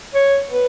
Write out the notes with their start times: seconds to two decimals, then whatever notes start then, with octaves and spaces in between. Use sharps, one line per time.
0.14 C#5
0.50 B4